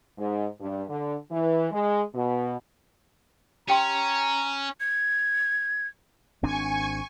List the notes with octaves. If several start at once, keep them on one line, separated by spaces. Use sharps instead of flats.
G#2
G2
D3
E3
G#3
B2
C#4 G4 G5 A#5 C6
G#6
G#1 C4 D4 G#5 C#6